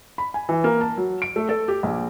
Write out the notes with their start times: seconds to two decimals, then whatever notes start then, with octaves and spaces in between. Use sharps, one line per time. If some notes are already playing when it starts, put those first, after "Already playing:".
0.18 B5
0.34 G#5
0.49 E3
0.64 A#3
0.81 A5
0.97 F#3
1.22 D7
1.36 A3
1.49 A4
1.68 G4
1.83 A#1